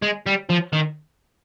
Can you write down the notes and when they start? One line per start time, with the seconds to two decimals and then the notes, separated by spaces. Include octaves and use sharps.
0.02 G#3
0.27 G3
0.50 F3
0.73 D#3